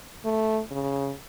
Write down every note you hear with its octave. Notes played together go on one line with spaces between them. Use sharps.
A3
C#3